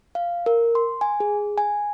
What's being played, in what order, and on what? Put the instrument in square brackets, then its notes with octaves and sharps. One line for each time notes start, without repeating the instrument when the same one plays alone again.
[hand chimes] F5
A#4
C6
G#5
G#4
G#5